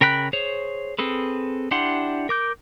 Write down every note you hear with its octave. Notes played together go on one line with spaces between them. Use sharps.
C#3 A#4 G5 B5 F#6
G#4 C5 C#5
C4 G#4 A4 B4
D4 E4 G4 F#5 C6
A#4 D6 G6